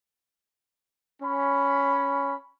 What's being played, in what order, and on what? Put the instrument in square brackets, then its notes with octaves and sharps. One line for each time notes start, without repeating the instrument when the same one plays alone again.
[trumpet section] C#4 B5